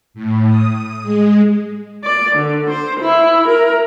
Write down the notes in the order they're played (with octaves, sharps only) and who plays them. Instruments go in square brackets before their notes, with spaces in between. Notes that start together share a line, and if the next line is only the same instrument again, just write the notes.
[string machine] A2
D#6
G#3
[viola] D5
D3
C5
E4
A#4